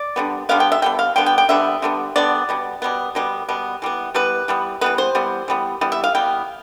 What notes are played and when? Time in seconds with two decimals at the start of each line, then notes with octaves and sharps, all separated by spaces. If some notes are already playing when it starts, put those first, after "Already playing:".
Already playing: D5
0.16 D3 G3 B3
0.49 D3 G3 B3 F5
0.60 G5
0.72 E5
0.82 D3 G3 B3 G5
0.99 F5
1.16 D3 G3 B3 G5
1.26 G5
1.38 G5
1.49 D3 G3 B3 E5
1.82 D3 G3 B3
2.16 D3 G3 B3 D5
2.49 B2 G3 B3
2.82 B2 G3 B3
3.15 B2 G3 B3
3.49 B2 G3 B3
3.82 E3 G3 B3
4.14 E3 G3 B3 B4
4.48 E3 G3 B3
4.81 E3 G3 B3 B4
4.98 C5
5.15 E3 G3 B3
5.48 E3 G3 B3
5.81 E3 G3 B3
5.92 E5
6.04 F5
6.15 E3 G3 B3 G5